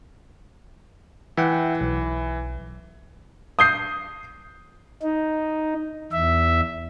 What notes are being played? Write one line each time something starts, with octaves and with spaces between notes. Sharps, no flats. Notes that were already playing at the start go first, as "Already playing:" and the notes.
E3 E5 F#5 G5
B1
D#6 G6 C7
D#4
E2 E5